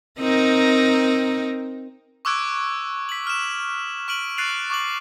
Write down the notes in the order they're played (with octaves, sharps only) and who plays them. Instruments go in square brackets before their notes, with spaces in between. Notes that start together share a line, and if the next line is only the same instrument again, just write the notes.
[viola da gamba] C4 D#4 A#4
[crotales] C#6 D6 E6 F#6 G#6 D7
B6 F#7
F6 E7
C#6 F6 D7 D#7 F#7
F#6 A6 C7 D7 D#7 F7
C#6 D6 F#6 F#7